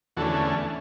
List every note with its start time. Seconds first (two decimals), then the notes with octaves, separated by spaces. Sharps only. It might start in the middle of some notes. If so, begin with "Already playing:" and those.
0.17 E2 D3 A3 C#4 F#4 A4